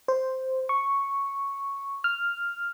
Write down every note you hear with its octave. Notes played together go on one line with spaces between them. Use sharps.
C5
C#6
F6